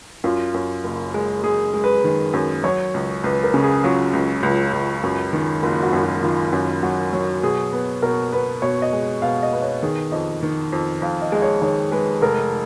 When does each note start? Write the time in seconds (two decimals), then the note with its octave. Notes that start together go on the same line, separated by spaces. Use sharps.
0.24 F#2 F4
0.54 F#2
0.84 F#1
1.14 G#3
1.44 G#3 G#4
1.74 G#3
1.84 B4
2.04 D#3
2.33 F#2
2.64 F#3 C#5
2.94 C#2
3.24 C#2 B4
3.44 A#4
3.54 C#3
3.63 G#4
3.84 F#3 F4
4.13 C#2
4.43 C#2 F4
4.73 C#2
5.03 F#2
5.33 D#3
5.63 F#1 F4
5.83 F#4
5.93 F#2
6.04 F#4
6.23 D#3 F4
6.53 F#2
6.83 F#3 F#4
7.13 F#3
7.42 B2 G#4
7.73 B3
8.02 B2 A#4
8.33 B3 B4
8.62 B2 C#5
8.82 D#5
8.93 G#3
9.22 B2 F5
9.43 D#5
9.53 B3
9.62 C#5
9.83 D#3 G#4
10.12 F2 D#5
10.43 D#3
10.72 F2
11.02 F2 F5
11.22 D#5
11.32 G#3 D#5
11.42 C#5
11.62 D#3 C#5
11.92 G#3 B4
12.21 F1 A#4